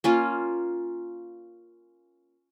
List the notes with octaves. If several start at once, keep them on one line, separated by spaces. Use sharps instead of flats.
A#3 C#4 F4